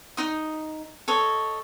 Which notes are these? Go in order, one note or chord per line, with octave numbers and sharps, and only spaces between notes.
D#4 D#6
A4 C#5 D#5